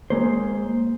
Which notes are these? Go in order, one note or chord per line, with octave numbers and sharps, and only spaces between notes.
G#3 A#3 C5